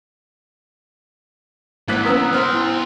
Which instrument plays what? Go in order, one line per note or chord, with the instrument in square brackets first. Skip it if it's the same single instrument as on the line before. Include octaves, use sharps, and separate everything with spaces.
[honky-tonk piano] G#1 F#6 B6 [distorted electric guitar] A#3 C4 [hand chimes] E4 A#4
[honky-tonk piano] B3 C#4 A#4 [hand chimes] D#6 E6 F#6
[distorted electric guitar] B3 C6 [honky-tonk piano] C5 F6
[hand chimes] E4